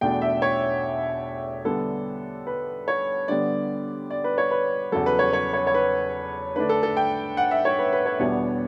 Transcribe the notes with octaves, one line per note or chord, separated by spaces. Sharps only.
E2 B2 A3 D4 G5
E5
C#5
D3 G3 B3 D4 A4
B4
C#5
D3 G3 B3 D5
D5
B4
C#5
B4
E2 C#3 F#3 A4
B4
C#5
C#5
C#5
C#5
B4
D3 A3 D4 B4
A4
A4
G5
F#5
E5
C#5
B4
B4
C#5
E2 B2 G3 B3 D4 C#5